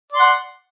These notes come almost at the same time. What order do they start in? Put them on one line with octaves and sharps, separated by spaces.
D5 C6 F#5